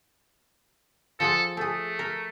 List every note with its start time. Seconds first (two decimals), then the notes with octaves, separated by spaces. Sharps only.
1.20 F3 G#4 A4 F#5
1.57 A3 G#4 A4
1.99 A#4